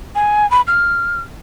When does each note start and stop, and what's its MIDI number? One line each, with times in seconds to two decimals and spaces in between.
0.15 0.49 80
0.51 0.61 83
0.67 1.20 89